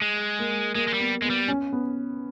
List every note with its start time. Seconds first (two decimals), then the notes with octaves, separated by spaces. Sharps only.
0.02 G#3
0.39 A#3
0.75 G#3 A#3
0.88 G#3
0.94 G3
1.00 B3
1.22 G#3 B3
1.30 G3
1.48 C#4
1.73 B3